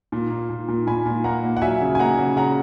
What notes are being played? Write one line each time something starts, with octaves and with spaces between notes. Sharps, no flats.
A#2
A#3
A#2
A#2
A#2 G#5 B5
A#2
A#3 F#5 A#5
A#3
F#5
F#3 E5 G#5
C#3
G#5
A#3 F#5 A#5
C#3
C#3 F#5 A#5